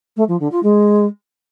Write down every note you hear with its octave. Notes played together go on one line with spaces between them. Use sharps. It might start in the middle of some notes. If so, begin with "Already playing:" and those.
A3
F3
D3
F4
G#3